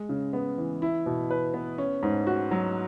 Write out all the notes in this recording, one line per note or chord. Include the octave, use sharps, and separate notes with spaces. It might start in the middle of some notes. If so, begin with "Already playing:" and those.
Already playing: G#3
C#3
B3
E3
E4
B2
B4
B3
C#4
G#2
F#4
F#3